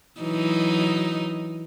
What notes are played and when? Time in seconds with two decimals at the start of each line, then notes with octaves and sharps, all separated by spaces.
0.21 E3 F#3 D#4